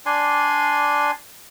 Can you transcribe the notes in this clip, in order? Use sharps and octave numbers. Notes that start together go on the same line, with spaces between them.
D4 D5 G#5 C6